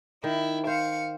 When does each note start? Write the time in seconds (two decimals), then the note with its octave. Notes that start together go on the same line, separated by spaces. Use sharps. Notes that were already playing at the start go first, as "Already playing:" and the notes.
0.24 D#3 E4
0.67 C5 F5 C#7